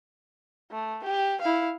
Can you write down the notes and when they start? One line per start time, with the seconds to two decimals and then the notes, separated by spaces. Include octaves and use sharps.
0.71 A3
1.04 G4
1.41 E4 F5